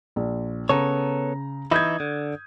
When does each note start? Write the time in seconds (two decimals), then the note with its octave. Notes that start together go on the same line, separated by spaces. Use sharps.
0.16 A#1
0.69 C#3 B3 A4 C#5 A#5
1.71 E3 D#4 E4 D#6 G6 G#6
2.00 D3